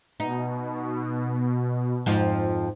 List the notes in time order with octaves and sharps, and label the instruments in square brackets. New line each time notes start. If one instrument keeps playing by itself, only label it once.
[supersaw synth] B2 [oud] D#4
[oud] F2 G#2 F3